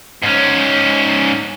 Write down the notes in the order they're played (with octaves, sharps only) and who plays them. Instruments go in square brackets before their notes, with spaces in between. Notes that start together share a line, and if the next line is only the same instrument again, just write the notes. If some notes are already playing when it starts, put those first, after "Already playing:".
[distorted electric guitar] G#2 C#4